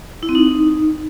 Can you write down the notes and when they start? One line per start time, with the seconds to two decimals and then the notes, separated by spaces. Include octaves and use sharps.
0.23 E4
0.29 C4
0.35 D#4